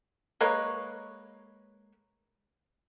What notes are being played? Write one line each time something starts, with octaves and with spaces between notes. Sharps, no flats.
G#3 A#3 B4 C#5